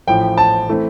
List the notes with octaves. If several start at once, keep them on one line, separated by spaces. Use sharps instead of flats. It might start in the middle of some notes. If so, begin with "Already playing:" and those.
A1 A2 F3 G5
A5
E3 A3 C4